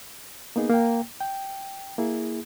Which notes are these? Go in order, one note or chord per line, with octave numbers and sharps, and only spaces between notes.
A#3 B3 D#4 G#4
A#3 G5
G5
A#3 E4 G#4